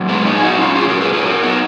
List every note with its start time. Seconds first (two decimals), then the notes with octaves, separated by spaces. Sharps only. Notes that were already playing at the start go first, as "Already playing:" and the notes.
Already playing: A#2 F#3
0.09 G#3 B3
0.26 B3 D#4
0.35 G#4
0.42 D#4 F#4
0.59 C#4 F4
0.75 F4 G#4
0.89 F#4 A#4
1.01 G#4 B4
1.13 G#4 B4
1.26 F#4 A#4
1.43 B3 D#4